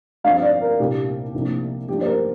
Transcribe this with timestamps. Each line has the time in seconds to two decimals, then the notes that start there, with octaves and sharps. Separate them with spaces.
0.24 G2 F3 C4 F5
0.42 D5
0.61 A#4
0.78 C2 A#2 A#3 D4 G4
1.34 C2 C3 F3 A#3 D4
1.88 G2 F3 A#3 D4 G4
2.01 C5
2.06 A#4